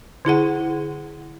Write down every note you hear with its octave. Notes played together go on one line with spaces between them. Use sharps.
D3 E4 G#4 F#5